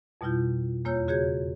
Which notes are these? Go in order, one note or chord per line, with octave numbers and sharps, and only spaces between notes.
F2 B2 G3 E4 F4 G6
E2 A#3 F4 C#5 E6 G6
C#3 F#4 G#4 C#5 G6 G#6